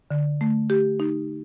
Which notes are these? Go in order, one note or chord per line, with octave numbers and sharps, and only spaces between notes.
D3
A3
G4
D#4